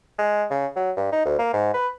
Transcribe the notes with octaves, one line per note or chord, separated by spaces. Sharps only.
G#3
C#3
F#3
G2
D#4
D2
A#3
G#2
B4